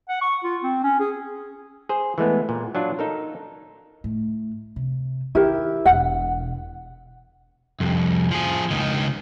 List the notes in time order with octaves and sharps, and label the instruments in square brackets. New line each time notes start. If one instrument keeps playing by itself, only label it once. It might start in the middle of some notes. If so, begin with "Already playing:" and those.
[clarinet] F#5
C#6
F4
C4
C#4
G#4
[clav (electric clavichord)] G#4 C5
E3 G#3 A3 B3
A#2
F#3 D4 F4
D#4 A4 A#4
[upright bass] A2
C3
[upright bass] D#3 [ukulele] E4 G4 A#4
[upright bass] E1 B2 [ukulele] F#5
[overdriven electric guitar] C2 F2
F3 G#4
C#2 D#3